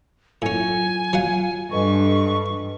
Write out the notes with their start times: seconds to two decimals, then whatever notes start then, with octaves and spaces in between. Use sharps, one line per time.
0.42 A2 F#3 C#4 F4 G#5
1.13 F#3 F4 F5 F#5
1.71 G2 A4 B4 D#5 C#6